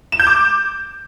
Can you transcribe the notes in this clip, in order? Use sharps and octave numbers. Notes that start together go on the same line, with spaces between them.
E7
G6
D6